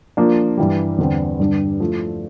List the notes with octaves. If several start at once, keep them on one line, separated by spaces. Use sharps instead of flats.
F3 A#3 D4
G2 E3 G3
E2 D3 G3 C4
G2 D3 G3 D4
F3 A3 E4